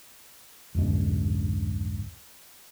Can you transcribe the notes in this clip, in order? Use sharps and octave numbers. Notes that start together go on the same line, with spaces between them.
C2 F2 G#2 D3